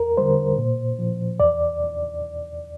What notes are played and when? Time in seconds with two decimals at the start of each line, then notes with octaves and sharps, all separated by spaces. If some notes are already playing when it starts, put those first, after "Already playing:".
Already playing: E2 A#4
0.17 D3 G3 C5
0.58 A#2
0.99 F3
1.39 E2 D5